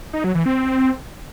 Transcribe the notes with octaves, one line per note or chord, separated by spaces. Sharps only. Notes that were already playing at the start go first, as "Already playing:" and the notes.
D#4
F#3
E3
C4